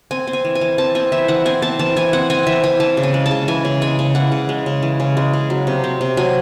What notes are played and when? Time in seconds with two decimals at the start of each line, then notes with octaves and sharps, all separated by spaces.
0.11 C4 G#5
0.27 C4
0.33 G#5
0.45 E3
0.55 G#5
0.61 E3
0.78 C4 A5
0.95 C4 G#5
1.12 E3 E5
1.28 E3 F#5
1.45 C4 G#5
1.62 C4 A5
1.79 E3 A5
1.96 E3 G#5
2.13 C4 F#5
2.30 C4 G#5
2.47 E3 E5
2.64 E3 G#5
2.80 E3 A5
2.97 C#3
3.03 G#5
3.14 G#3
3.26 A5
3.31 C#3
3.48 E3 G#5
3.65 C#3
3.81 G#3 G#5
3.99 C#3
4.15 E3 F#5
4.32 C#3
4.49 G#3
4.66 C#3
4.82 E3
5.00 C#3
5.17 G#3
5.33 C#3
5.50 F#3
5.67 C3
5.84 C4
6.01 C3
6.17 F#3 G#5